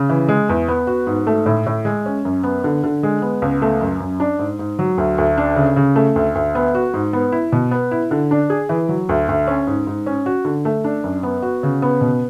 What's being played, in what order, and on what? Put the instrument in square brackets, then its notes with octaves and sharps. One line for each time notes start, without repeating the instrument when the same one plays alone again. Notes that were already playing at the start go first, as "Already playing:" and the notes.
Already playing: [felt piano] C#3
E3
G#3
E2
B3
F#4
G#2
A3
A2
A2
G#3
C#4
F#2
B3
D3
D3
G#3
B3
C#2
A3
F#2
F#2
D4
G#2
G#2
F#3
D2
D2
D4
C#3
C#3
A3
D2
D2
B3
F#4
G#2
B3
E4
B2
B3
E4
D3
D4
G#4
E3
F#3
D2
D2
C#4
G#2
G#2
C#4
F#4
D3
A3
D4
F#2
B3
F#4
C#3
B3
B2